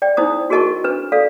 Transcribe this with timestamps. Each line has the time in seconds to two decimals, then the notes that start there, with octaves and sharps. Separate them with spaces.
0.02 D5 G5
0.17 D#4 E4 C5 D#6
0.50 F#4 G#4 A#4 D#5 A5 C#6
0.84 D4 B4
1.12 A4 D5 F5